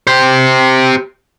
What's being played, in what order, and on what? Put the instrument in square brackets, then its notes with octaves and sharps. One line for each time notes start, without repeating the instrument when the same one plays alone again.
[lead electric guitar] G4 C5